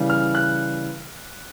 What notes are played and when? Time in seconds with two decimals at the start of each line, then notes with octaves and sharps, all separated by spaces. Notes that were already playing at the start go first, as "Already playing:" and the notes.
Already playing: C#3 E3 G3
0.10 F6
0.35 F#6